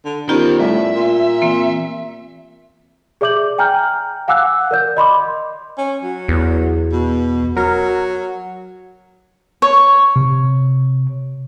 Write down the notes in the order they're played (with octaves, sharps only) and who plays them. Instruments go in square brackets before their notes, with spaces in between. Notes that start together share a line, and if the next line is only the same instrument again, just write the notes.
[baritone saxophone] D3
[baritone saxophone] D#3 [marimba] B3 F4 G4 [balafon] C#4 A#4 [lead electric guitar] C5 D5
[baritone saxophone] A2 [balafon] G3 A3 D5 [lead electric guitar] E5
[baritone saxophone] A#2 [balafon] C6
[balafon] E3 [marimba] A#3 C4
[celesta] G#4 D5 E5 D6 G6 F#7
G5 G#5 A#5 F6 G6
F5 F#5 G#5 D6 E6 F#6
A#4 D5 G6
D#5 B5 C6 D6
[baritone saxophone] C#4
F#3
[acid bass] E2
[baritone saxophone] B2
[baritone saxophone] F#3 [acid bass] A#4
[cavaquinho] C#5
[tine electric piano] C3